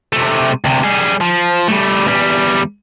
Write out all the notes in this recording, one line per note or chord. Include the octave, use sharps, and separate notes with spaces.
C3 A3
D2 C3
G3 G#4
F3
G3 A3
E2 G3